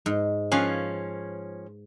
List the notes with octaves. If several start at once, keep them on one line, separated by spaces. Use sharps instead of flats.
G#2
F3 C#4 B4 F5